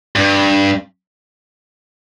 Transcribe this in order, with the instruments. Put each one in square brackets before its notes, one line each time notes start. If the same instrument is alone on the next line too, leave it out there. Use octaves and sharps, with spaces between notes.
[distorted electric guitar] G2